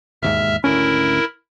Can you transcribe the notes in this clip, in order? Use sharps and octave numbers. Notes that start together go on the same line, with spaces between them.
E1 D#2 G#2 E5 F6
G#1 D2 C#4 E4 A#4